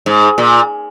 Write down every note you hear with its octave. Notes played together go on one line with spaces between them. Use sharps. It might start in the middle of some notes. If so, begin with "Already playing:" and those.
G#2
A#2